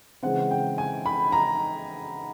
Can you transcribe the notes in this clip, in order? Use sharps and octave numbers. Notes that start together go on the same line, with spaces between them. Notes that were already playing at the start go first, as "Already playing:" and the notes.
C#3 E3 G#3 C4 F#5
G5
G#5
B5
A#5